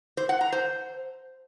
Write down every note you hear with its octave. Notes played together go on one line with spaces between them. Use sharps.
C5
F#5
A#5
C5